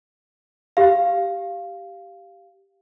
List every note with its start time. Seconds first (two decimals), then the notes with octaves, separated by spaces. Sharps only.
0.77 G4 F5